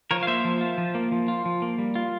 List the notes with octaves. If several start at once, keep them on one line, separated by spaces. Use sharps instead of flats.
F3 A#4 C#5
F5
A#3 C5 E5
F3
F4
F3
A#3
F3
F4
F3
A#3
G3
F4